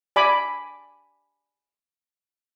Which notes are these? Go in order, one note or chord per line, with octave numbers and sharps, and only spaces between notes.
D5 G#5 B5 D6